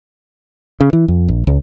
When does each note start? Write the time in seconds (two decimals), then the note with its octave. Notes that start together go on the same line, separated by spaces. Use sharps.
0.81 C#3
0.93 E3
1.08 F2
1.28 A#1
1.47 C#2